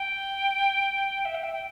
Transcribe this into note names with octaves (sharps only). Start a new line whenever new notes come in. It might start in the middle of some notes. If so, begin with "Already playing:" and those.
Already playing: G5
E5
G5
E5
G5